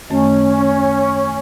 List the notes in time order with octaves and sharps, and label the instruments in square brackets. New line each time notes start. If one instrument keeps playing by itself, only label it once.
[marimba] F#2 D#3 A3 [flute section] C#4